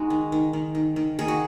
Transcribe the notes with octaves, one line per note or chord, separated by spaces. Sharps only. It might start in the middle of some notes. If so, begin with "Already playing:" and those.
Already playing: G#3 D#4 F#4
D#3
D#3
D#3
D#3
D#3
D#3 G#4
F#4